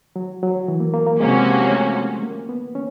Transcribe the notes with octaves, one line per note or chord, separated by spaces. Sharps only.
F#3
F#3
E3
A#3
A#3
A#3
C3 F3 G#3 A#3 C#4 F#4
A3
A#3
B3
C#4